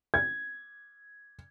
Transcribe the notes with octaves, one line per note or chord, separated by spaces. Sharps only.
G#6